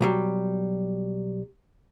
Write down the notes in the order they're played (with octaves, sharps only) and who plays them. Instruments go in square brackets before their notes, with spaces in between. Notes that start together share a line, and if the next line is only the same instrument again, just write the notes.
[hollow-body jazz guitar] B1 F#3 G3